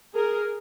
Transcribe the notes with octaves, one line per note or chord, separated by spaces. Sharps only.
G#4 A#4